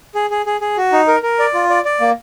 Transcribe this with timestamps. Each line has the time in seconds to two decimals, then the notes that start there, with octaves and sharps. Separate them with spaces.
0.15 G#4
0.30 G#4
0.46 G#4
0.61 G#4
0.77 F#4
0.92 D#4
1.08 A#4
1.23 A#4
1.39 D5
1.54 F4
1.70 D5
1.85 D5
2.00 A#3